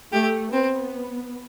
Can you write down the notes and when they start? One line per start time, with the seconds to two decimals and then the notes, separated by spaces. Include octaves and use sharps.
0.13 A3 G4
0.53 B3 C4